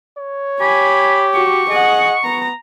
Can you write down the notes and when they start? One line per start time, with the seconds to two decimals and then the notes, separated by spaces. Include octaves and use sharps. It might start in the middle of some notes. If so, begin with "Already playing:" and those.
0.18 C#5
0.61 G4 G#5 B5
1.34 F#4 C#6
1.70 G#4 D#5 F#5
2.24 B3 A#5